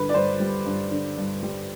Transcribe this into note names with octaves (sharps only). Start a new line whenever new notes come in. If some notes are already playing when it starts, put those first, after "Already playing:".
Already playing: G2 D3 B4
D5
G2 C5
G3
G2
D3
G2
G3